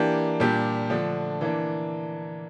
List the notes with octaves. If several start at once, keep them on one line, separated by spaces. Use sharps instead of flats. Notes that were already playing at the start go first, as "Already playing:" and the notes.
Already playing: E3 A#3 D4 G4
A#2 G3 D4 G4
D3 F3 A3 D4
E3 A#3 D4